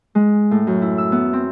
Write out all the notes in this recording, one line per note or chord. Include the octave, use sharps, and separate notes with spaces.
G#3
A2
F#2
E4
E6
B3
C4